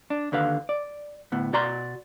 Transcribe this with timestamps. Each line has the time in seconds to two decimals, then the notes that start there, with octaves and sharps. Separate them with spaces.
0.10 D4
0.32 D#2 D3 B4 F5
0.69 D5
1.32 D2 A2 B3
1.53 B2 F#4 D5 A#5 C6